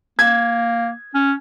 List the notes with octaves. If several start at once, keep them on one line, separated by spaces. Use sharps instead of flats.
A#3 G#6
C#4